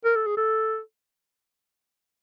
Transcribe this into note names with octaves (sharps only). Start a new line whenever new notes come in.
A#4
A4
G#4
A4